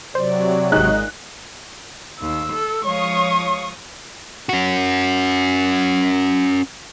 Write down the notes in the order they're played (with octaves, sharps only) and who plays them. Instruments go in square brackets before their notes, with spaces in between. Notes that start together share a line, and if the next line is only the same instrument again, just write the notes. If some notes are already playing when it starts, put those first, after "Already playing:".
[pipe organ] C3 F#3 [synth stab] C5 [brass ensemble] D5
[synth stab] G#1 G#3 [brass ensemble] A#2 [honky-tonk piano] D#4 F#6
[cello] D#2 [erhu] E6
[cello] A4
[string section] F3 C#5 D#6 [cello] G#3 F5 [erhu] C#6
[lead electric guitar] C#4 F#4